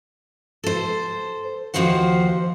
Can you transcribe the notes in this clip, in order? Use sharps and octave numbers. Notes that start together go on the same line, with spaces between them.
A4 C5
D#2 E3 F3 F#4 C5 F#5